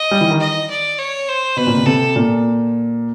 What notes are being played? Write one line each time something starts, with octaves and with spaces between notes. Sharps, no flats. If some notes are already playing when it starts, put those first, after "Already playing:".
Already playing: D#5
G3
E3
D#3
D#5
D5
C#5
C5
B2 B4
A#2
C3
C3 A4
A#2